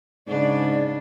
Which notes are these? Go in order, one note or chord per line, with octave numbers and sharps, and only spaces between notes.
G#2 C#3 D4 D5